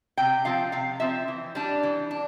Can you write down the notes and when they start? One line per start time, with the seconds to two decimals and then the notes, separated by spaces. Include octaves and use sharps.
0.17 C3 G5
0.45 F3 C4 F5
0.72 C3 F5
1.00 F3 C4 E5
1.28 E3
1.55 G3 D4
1.83 E3
2.11 D4